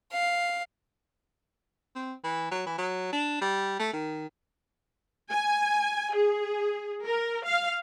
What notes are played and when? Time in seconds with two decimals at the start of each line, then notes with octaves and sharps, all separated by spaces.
0.13 F5
1.95 C4
2.24 E3
2.51 F#3
2.66 E3
2.78 F#3
3.13 D4
3.41 G3
3.79 A3
3.93 D#3
5.31 G#5
6.14 G#4
7.06 A#4
7.45 F5